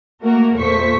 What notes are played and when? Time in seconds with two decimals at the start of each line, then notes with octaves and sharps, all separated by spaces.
0.23 A3 A#3 F#4 A#4
0.56 E2 A#2 A3 C5 C#6 B6